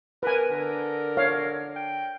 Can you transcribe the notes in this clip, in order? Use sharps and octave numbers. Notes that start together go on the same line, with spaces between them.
A#4 B4 G#5
D3 A#4
C#5 F5
G5